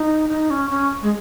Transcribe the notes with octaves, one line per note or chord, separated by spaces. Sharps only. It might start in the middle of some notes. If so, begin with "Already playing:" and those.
Already playing: D#4
D#4
C#4
C#4
G#3